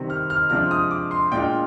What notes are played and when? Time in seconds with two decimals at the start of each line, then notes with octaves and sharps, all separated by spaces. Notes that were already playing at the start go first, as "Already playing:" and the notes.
Already playing: C3 D#3 G3 C4
0.10 F6
0.30 F6
0.50 C3 F3 G#3 D4 F4 F6
0.71 D#6
0.91 D6
1.11 C6
1.31 A#2 G#3 D4 F4 G5